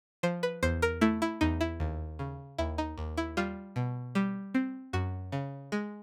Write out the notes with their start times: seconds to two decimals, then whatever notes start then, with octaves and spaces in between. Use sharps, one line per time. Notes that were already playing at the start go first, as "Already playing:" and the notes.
0.23 F3 C5
0.43 B4
0.63 E2 C5
0.82 A#4
1.01 A3 E4
1.22 E4
1.41 E2 D#4
1.61 E4
1.80 D#2
2.19 C#3
2.58 D#2 E4
2.78 D#4
2.98 D#2
3.17 E4
3.37 G3 F4
3.76 B2
4.15 G3
4.55 C4
4.93 F#2 F#4
5.32 C#3
5.72 G#3